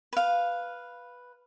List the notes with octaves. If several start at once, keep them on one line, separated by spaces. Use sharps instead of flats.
B4 F5